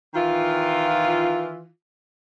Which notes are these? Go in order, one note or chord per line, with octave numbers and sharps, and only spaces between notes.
D#3 E3 F4